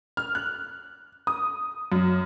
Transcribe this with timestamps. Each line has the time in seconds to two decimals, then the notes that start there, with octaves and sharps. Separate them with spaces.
0.17 F6
0.35 F#6
1.27 D#6
1.92 F#2